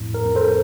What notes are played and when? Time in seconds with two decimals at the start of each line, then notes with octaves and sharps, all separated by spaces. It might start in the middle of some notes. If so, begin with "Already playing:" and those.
Already playing: F2 A2
0.14 A#4
0.25 F2
0.35 A4 C5